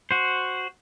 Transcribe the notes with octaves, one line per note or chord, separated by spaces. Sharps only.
F#4 C5